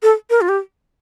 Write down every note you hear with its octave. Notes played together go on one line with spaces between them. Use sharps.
A4
A#4
F4
G4